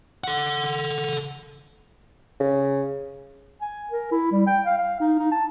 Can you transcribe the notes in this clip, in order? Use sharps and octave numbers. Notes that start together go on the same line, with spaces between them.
A4 F#5
C#3
G#5
A#4
E4
G3
G5
F5
F5
D#4
D#4
A5